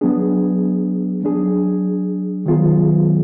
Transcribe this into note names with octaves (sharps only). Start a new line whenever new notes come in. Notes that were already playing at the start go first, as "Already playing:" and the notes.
F#3 B3 D4 G#4
F#3 D4 G#4
D#3 F#3 B3 F4 G#4